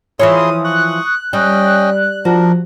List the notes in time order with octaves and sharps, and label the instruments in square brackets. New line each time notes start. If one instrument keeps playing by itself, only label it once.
[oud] E3 F3 C#5 [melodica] E4 G#4 C6
[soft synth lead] D#6
[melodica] C#6 D#6 [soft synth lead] F#6
[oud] G3 [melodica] C#4 D#5 G5
[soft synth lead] F3 [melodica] D4 A#4 [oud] F#4